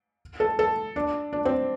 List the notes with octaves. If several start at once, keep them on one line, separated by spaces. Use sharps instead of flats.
A4
A4
D4
D4
C4